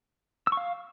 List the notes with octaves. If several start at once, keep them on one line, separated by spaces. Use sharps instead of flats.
E6
C#6
F5